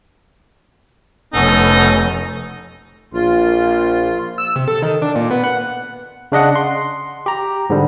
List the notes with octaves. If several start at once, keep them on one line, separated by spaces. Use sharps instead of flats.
F1 B3 C#4 D#4 A4
A#1 F4
E6
C3
A4
D#3
D4
A#2
B3
F#5
C#3 D4 D#5 F#5
C6
G4 A#5
G#2 D3 G3